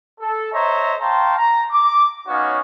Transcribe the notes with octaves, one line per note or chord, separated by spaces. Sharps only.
A4
C5 C#5 D#5 E5 A#5
F5 G5 A5 A#5 C6 C#6
A#5
D6
B3 C#4 D#4 F#4 C#5 F5